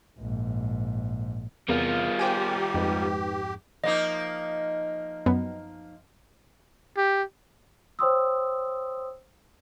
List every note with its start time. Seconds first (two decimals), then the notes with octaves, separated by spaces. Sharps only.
0.18 A#1 G#2
1.69 E2 C3 G3 B3 F4 G#4 A#4
2.19 G4 C5 G5 G#5
2.74 F2 G#2 D#4 B4
3.84 F3 A#3 D#4 D#5
5.26 F#2 B3
6.97 G4
7.99 C5 C#5 G5 C6 D#6 E6